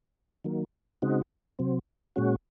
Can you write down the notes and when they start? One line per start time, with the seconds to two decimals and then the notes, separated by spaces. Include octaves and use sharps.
0.44 D#3 F#3 A#3
1.02 C#3 G#3 C4 D#4 F#4
1.59 C3 F#3 C4
2.16 A#2 G#3 C#4 F#4